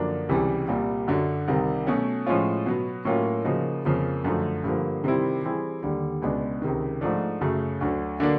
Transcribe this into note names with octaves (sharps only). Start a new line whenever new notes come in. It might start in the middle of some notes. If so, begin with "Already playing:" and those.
Already playing: F#2 D3 F3 A#3 D4
C#2 C3 E3 G3
C2 A#2 G3
F#2 D3 F#3
C2 C3 D#3 G3
B2 F#3 A3 C#4
A2 F3 G#3 C#4 F4
B2 F#3 B3
A2 F#3 A#3 C#4 F4
C#3 F3 A#3 D#4 F#4
F2 C#3 F3 A#3
F#2 D3 F3 A3
G2 D3 F3 A#3
C3 D#3 G3 C4 E4
E3 G3 C4 E4 G#4
D#2 D3 G3
C#2 B2 G#3 B3 D4
C#2 C3 D#3
G#2 F3 A3 D4
F#2 C#3 F#3 A3
D2 D3 F#3
D3 F#3 A#3 D4